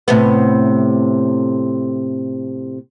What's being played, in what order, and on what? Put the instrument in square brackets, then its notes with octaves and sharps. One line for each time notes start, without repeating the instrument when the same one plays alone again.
[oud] A2 C3 B3